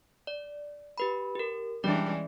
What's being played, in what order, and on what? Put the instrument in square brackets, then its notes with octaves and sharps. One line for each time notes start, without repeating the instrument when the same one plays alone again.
[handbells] D5
G4 B4 B5
G4 A#4
[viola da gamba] E3 G#3 C#4 [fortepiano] G3 D4 [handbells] D5